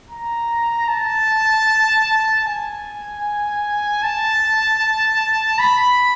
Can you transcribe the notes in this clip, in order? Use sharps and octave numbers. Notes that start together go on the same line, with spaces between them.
A#5
A5
G#5
A5
B5